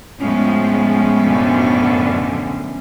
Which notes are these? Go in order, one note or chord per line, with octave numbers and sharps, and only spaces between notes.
F2 A2 F3 G#3 B3 C#4
F#2 B2 D3